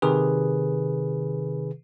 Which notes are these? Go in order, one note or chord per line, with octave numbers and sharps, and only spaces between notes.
C3 D#3 G#4 B4